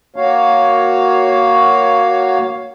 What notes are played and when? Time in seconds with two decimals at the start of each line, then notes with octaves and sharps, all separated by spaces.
0.16 A#3 F#4 C#5 F5